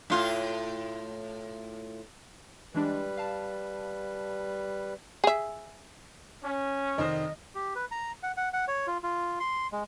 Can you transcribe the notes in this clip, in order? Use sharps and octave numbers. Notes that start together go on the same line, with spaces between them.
A2 F4
E3 G3 G#3 D4 B4
F5 A5
G#4 E5
C#4
F1 D#3 C5 D#5
G4
B4
A#5
F#5
F#5
F#5
C#5
F4
F4
C6
G#3